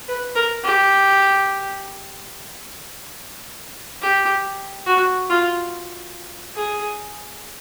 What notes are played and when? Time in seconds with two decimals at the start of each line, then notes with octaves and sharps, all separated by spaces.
0.08 B4
0.35 A#4
0.64 G4
4.02 G4
4.86 F#4
5.30 F4
6.56 G#4